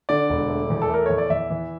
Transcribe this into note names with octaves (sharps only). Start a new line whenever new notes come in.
D3 D5
E1
A3
E2
A4
A3 A#4
E2 C#5
D5
E2 E5
E3